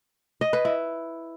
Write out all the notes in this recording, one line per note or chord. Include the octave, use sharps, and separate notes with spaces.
D#5
B4
E4